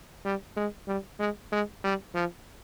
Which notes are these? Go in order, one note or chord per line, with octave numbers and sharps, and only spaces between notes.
G3
G#3
G3
G#3
G#3
G3
F3